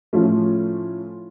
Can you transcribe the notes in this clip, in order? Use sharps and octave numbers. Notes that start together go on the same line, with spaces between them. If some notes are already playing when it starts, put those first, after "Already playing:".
A2 F3 A3 C#4 F4